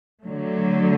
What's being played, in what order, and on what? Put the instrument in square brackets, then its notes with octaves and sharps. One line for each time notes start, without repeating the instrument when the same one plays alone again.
[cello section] D3 F#3 A3